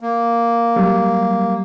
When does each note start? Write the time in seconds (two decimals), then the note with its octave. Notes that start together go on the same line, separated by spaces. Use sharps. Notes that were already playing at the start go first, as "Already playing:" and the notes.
0.01 A#3
0.76 F#3 G3